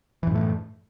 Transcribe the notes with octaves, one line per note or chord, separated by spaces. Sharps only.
F#2 A2 E3 A3